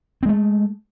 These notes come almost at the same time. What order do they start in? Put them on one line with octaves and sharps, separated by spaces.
C4 G#3 A3